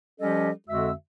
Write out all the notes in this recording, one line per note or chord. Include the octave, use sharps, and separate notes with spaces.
F3 G3 C#4 G4 A4 D#5
F2 D3 G#3 F#4 E5 E6